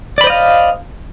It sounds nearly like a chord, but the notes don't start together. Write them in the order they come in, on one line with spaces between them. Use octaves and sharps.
D5 B5 C5 D#5 F5